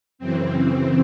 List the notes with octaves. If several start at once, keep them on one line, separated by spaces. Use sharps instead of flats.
F#2 C#3 E3 C4